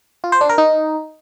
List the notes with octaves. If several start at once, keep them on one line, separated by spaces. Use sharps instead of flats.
F4
C5
D4
A#4
D#4